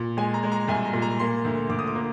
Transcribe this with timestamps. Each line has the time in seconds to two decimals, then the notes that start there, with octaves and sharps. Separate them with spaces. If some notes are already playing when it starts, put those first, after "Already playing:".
Already playing: A#2
0.17 G#3 G#5
0.34 A#5
0.43 G#3
0.52 A#5
0.68 C2 G#5
0.85 A#5
0.93 A#2
1.02 A#5
1.19 A#3 C6
1.45 D2
1.70 D2 D6
1.79 D#6
1.87 D6
1.95 A#3